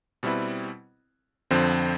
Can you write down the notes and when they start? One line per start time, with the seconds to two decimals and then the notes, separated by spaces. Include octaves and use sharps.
0.23 B2 G3 C4 E4 B4
1.51 F2 D3 F3 C4